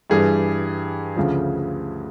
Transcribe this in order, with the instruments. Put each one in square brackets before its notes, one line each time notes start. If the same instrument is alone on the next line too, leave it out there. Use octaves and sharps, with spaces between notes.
[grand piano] G2 E3 G3 G#4
D2 C#3 F3